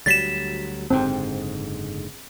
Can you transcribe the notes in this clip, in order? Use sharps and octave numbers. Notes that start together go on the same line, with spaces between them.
D2 F#3 G3 A6 B6 E7
F#1 G#2 D3 C4